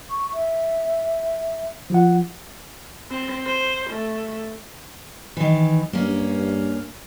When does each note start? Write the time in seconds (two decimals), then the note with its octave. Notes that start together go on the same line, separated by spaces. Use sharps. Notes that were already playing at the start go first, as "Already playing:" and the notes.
0.10 C#6
0.33 E5
1.90 F3 F4 F#5
3.10 C4
3.46 C5
3.90 A3
5.37 D#3 E3
5.93 G2 A#3 C#4